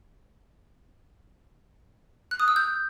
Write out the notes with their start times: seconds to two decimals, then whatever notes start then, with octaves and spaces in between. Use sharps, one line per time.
2.31 F#6
2.40 D#6
2.48 E6
2.56 G6